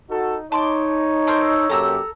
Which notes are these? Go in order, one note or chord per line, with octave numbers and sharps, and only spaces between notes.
D#4 F#4 A4
D#4 C#5 A5 C6 D6
A4 A#4 C5
F#2 A#3 G4 A4 A#5 E6